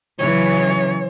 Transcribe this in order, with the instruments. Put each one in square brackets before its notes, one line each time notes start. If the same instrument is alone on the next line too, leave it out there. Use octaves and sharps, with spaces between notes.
[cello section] C#3 E3 F#3 [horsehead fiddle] C#5